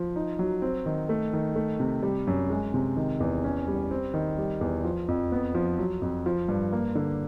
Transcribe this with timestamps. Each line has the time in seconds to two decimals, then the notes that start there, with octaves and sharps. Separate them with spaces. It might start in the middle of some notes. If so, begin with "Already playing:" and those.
Already playing: F3
0.16 D#4
0.39 F#3
0.62 C4
0.86 D#3
1.09 A3
1.33 D#3
1.56 A3
1.80 C3
2.03 G3
2.27 F#2
2.50 G#3
2.74 C3
2.96 D#3
3.20 E2
3.44 C#4
3.68 G3
3.91 C4
4.14 D#3
4.38 G3
4.61 E2
4.84 F3
5.08 F2
5.32 B3
5.55 F3
5.79 F#3
6.02 F2
6.26 F3
6.49 G2
6.73 A#3
6.95 D3